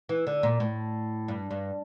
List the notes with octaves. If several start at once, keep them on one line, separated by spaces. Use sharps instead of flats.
E3
D3
A#2
A2
G2
G2